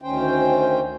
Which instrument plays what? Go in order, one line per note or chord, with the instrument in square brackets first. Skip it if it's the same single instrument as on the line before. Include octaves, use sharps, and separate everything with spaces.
[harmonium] D2 D#3 C#4 C5 G5